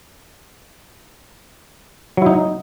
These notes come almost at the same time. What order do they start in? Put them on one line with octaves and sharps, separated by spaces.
F#3 E4 D#4